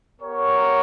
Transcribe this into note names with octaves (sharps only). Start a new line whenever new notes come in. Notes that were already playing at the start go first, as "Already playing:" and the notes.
B3 G4 A#4 C#5